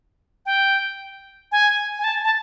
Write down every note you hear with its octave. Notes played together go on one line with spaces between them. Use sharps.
G5
G#5
G#5
A5
A5